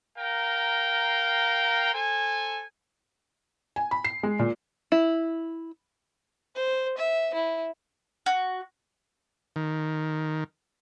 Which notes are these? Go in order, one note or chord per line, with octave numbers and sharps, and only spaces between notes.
A#4 F5 G5 A#5
A4 C5 G#5
G#5
B5
C7
G#3
A#2
E4
C5
E5
E4
F#4
D#3